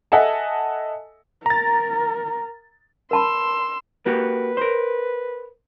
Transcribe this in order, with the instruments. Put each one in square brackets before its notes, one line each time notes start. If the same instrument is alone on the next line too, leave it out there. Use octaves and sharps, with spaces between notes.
[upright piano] A4 D#5 E5 F#5 G#5 A5
[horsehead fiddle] A#4 [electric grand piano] A#5 A6
[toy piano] A#4 A5 B5 [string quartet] C6 E6
[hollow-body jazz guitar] A#3 F#4 G4 [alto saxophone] B4
[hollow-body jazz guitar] A#4 C5